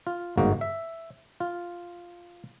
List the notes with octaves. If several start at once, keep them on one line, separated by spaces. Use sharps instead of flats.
F4
G1 G#2 A#3 F#4
E5
F4